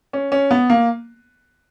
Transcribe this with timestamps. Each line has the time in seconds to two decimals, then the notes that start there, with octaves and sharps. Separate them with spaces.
0.13 C#4
0.32 C#4
0.51 B3
0.70 A#3